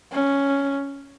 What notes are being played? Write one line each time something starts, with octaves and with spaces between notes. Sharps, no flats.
C#4